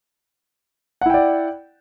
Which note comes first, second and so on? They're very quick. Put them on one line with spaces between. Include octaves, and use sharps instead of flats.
F#5 E4 G5 D5